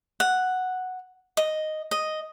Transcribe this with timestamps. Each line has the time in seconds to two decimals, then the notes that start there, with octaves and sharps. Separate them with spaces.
0.20 F#5
1.37 D#5
1.91 D#5